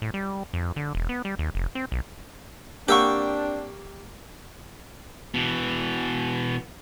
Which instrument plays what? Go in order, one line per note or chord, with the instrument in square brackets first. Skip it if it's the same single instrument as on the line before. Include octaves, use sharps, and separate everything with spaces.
[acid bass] A2
G3
F2
D3
E1
B3
G3
D#2
F1
C4
B1
[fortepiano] A#3 F#5 [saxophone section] C4 D4 [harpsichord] G4 [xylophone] C#6 E6 G6
[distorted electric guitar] B2 E3